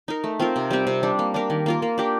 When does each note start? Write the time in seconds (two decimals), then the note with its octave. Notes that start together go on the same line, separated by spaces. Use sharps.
0.08 D#4 A#4
0.24 A3
0.40 C4 F4 A#4
0.56 C3
0.71 G3 C4 G4
0.87 C3
1.03 G3 D4
1.19 A#3
1.34 D4 G4 A#4
1.50 D#3
1.66 A#3 F4 A#4
1.82 A#3
1.98 D4 G4 A#4